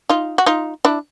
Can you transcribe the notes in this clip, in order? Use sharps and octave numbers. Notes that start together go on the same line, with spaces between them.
D#4 F4
F#4
D#4 F4
D4 E4